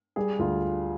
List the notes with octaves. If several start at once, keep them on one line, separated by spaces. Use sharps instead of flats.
G3 G#4
D2 F4